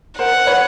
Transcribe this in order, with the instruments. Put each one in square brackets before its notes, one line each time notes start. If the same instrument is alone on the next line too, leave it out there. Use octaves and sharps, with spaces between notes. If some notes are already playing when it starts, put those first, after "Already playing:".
[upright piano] A#4 C5 [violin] F#5
[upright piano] A#4 C5
B4 C#5